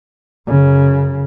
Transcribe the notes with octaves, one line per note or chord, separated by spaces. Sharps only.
F#2 C#3